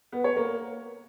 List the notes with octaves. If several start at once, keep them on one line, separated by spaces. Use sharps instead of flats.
B3
C#5
A#3